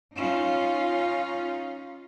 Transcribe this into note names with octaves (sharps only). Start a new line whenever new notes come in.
C#4 D#4 F4